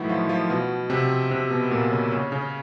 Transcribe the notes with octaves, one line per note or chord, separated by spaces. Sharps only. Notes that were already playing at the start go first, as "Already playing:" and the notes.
Already playing: A2 D#3 E3 F#3 A3 D#4 E4 F#4
F3 F4
F3 F4
B2 B3
C3 C4
C3 C4
B2 B3
A#2 A#3
C#3 C#4
C#3 C#4
C#3 C#4